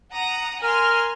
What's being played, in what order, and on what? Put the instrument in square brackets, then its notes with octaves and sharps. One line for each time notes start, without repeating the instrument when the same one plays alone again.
[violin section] F#5 A#5 D#6
[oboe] A#4 [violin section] G#5 C6 F6